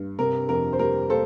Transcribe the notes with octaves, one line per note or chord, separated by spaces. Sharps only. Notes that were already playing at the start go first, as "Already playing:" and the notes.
Already playing: G2
C3 A#4
F2 A#4
C5
G3 A#4
A#3 A4 C5